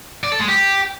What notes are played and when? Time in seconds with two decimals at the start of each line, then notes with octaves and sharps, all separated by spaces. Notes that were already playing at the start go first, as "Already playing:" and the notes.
0.24 D5
0.32 A4
0.40 G#3
0.48 G4